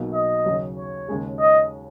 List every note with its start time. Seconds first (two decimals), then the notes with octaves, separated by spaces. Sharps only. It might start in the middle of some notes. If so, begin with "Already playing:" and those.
Already playing: B1 B2 A#3 D#4
0.14 D#5
0.46 D#2 C#3 F#3
0.77 C#5
1.08 D#2 C#3 G#3 C#4 G#4
1.40 D#5